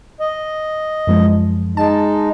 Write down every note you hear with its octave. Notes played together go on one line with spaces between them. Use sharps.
D#5
F#2 F3 G#3
G#3 D#4 A5